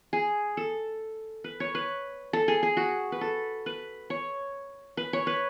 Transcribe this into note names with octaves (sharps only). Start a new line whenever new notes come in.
G#4
A4
B4
C#5
B4
A4
G#4
G#4
F#4
B4
A4
B4
C#5
B4
C#5
B4